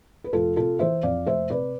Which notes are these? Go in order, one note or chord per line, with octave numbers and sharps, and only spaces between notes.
B4
F1 F4 A4
C3 F4 A4
E3 C5 E5
F2 D5 F5
F1 C5 E5
C3 B4 D5